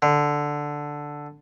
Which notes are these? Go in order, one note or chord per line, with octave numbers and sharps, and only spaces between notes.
D3